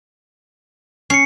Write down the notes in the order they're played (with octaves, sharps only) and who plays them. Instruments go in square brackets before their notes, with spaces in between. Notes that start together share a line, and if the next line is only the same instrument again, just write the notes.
[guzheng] C#4 [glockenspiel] C7 C#7